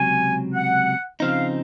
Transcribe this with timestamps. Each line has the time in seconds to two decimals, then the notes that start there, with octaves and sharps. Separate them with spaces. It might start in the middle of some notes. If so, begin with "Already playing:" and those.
Already playing: C#2 C3 F#3 G#5
0.53 F#5
1.20 C#3 F3 C4 D#4 F5